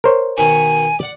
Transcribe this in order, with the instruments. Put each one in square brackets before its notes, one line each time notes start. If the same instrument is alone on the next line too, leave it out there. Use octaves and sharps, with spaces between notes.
[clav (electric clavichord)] A#4 C5 C#5
[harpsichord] B2 D#3 C#6 [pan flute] G#5
[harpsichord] D5 F#5